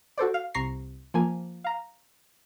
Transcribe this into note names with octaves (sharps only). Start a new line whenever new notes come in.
F#4 A4 C5 D5
F5
C2 C3 A#5 C#6 A#6 C7
F3 A#3 G#5
F5 A#5